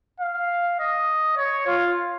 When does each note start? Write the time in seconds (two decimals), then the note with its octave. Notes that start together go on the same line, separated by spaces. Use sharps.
0.20 F5
0.79 D#5
1.36 C#5
1.67 F4